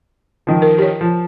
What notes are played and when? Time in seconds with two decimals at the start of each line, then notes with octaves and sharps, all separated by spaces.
0.47 D#3 F3
0.62 A#4
0.78 G4 C#5
1.01 F3